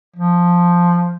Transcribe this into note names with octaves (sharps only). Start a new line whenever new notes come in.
F3